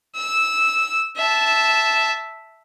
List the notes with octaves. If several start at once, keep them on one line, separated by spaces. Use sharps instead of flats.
E6
E5 A5